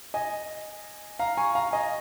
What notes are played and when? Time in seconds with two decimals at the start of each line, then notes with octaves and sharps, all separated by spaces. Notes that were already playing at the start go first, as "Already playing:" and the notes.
0.14 D#5 G#5
1.19 F5 A#5
1.37 G#5 C#6
1.55 F5 A#5
1.72 D#5 G#5